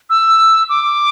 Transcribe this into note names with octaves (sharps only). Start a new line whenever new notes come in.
E6
D6